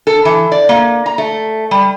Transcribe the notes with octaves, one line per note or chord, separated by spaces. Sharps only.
A4
E3
D5
A#3
A#5
A3
G3